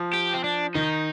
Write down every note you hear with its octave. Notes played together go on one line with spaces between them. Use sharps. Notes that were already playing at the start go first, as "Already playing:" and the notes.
Already playing: F3
G4
C4
D4
D#3 D#4